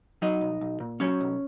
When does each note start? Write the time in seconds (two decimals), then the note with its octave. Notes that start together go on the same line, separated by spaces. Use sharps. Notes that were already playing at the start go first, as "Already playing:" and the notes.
0.22 F#3 D#4 D#5
0.41 B1
0.61 B1
0.80 A#2
1.00 F#3 C#4 C#5
1.21 B1